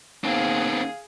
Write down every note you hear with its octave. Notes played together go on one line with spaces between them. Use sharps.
D#2 B3 C4 G#4 F5